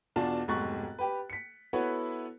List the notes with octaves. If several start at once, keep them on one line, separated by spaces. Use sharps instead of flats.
E2 B2 D4 F4 A5
F1 B1 G#2 C#6 F#6 A6
G4 B4
B6 C#7
B3 E4 F#4 A4 B4 C#5